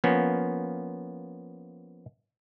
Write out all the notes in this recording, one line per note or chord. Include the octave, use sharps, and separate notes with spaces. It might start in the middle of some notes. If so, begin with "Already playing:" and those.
F3 A#3 B3 C#4